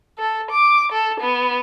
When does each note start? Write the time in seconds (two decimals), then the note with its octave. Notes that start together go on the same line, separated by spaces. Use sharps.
0.18 A4
0.51 D6
0.92 A4
1.20 B3